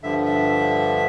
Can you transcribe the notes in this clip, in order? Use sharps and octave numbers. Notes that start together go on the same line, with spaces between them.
G2 D3 F3 E5
E5